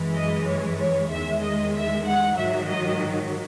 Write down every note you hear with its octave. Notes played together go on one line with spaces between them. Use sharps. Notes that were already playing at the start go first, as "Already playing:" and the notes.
Already playing: F#2 E3 G#3
D#5
C#5
C#5
E2 D#3 G#3 E5
D#5
E5
F#5
G#2 D#3 F#3 E5
D#5